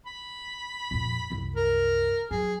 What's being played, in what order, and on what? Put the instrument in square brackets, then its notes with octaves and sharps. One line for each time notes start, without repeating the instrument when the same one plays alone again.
[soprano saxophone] B5
[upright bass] F2 A#2
C2 F#2
[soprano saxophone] A#4
[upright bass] F#3 [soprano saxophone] G#4